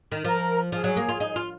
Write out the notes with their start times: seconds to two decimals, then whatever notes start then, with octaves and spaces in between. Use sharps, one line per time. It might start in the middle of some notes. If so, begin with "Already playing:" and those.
0.12 D#3
0.24 F3 A#4
0.72 F3 G#4
0.84 F#3
0.97 A#3
1.09 F4
1.20 D#4
1.36 F4